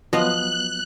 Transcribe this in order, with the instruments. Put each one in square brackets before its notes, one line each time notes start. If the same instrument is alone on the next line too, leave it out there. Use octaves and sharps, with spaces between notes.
[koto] F3 [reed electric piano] F#3 B3 [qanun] D#5 F5 [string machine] F#6